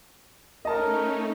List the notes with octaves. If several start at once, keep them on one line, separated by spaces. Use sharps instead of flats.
A3 C#4 D#4 A#4 D#5 A5